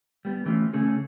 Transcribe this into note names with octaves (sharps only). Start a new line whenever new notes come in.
G3 B3
E3 A3 C#4 E4 F4
C#3 A3 C#4 G#4 A4